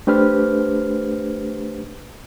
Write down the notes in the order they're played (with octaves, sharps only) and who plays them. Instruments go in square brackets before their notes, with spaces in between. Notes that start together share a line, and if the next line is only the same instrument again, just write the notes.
[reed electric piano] A3 D4 G4 B4 C5 F6